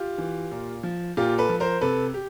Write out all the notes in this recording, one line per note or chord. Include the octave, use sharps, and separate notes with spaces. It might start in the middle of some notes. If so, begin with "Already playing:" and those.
Already playing: F4 G4
E3
A#2
F3
A#2 F4 G4
A4 B4
F3
A#4 C5
C3 A4 B4
G4